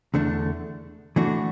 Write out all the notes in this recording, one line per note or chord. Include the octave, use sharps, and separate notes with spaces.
E2 D3 A3 D4
E3 A3 D4 F#4